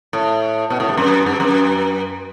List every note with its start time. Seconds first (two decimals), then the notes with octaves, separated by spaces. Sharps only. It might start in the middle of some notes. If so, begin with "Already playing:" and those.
0.13 A2
0.70 B2
0.80 A2
0.89 G2
0.97 F#2
1.26 G2
1.40 F#2